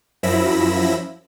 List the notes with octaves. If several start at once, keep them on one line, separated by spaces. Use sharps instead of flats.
F#2 F3 E4 B5 E6 A#6